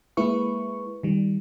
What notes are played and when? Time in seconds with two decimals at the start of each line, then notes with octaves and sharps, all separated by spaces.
0.17 G#3 A#3 E4 B4 C#6
1.03 D#3 G3